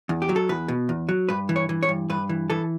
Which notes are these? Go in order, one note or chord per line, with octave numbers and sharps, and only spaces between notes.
E2
G4
F#3
A4
E2 B4
B2
E2
F#3
G2 B4
E3
C#5
E3
C#5
G2
G2 B4
E3
E3 A4